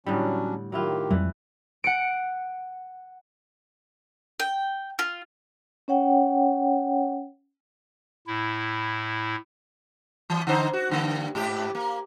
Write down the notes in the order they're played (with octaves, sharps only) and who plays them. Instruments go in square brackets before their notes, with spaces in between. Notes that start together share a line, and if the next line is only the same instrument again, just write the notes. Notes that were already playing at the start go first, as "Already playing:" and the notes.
[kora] A2 D3 G3 [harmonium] F#3 C#4 D4
[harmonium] D#3 G4 [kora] F#3 E4 F4
[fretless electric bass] F2 F#3 G3 [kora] E3
[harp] F#5 C#7 D7
[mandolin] G5
F4
[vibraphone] C#4 C#5 F#5 G5
[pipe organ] A2 E4
[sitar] E3
D3 D#4 C5
F#4
G2 D3 A#3
G#2 G4
A#3